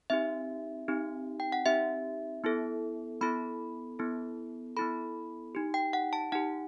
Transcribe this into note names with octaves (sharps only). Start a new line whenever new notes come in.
C4 D#4 G4 E5
C4 D#4 G4
G5
F#5
C4 D#4 G4 E5
B3 E4 A4
B3 E4 A4 B5
B3 E4 A4
B3 E4 A4 B5
D#4 G4
G5
F#5
A5
D#4 G4 F#5